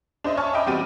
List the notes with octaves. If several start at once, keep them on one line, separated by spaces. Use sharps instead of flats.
D4 C5 D#5 E5
C#5 E5 G#5 A5 C#6 F6
D#5 E5 G5 B5 D6
E2 G3 C4 F#4 G4 D#7